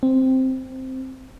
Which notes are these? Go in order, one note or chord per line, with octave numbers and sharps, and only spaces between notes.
C4